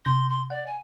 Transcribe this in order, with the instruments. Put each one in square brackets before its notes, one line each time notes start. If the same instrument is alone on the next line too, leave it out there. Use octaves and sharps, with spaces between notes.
[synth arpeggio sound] C3 G6 A#6 [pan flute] C6
[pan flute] C6
[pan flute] D5 [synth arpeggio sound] F#5
[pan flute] G#5